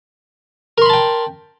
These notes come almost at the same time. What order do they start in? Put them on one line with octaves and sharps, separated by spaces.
A#4 C6 B5 A5 G5